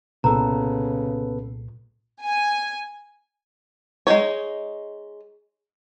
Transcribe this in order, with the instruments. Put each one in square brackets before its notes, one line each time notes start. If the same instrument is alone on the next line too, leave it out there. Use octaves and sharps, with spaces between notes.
[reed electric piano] C2 A#2 [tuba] C#3 [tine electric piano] B3 A4 B4 [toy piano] A#5
[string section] G#5
[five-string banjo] G#3 A3 D#4 C#5